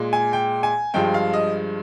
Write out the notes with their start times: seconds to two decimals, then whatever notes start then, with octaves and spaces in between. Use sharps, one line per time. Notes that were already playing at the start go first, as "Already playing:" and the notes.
Already playing: A#2 G#3
0.13 G#5
0.33 G5
0.63 G#5
0.94 G2 F3 G#3 G5
1.14 F5
1.33 D#5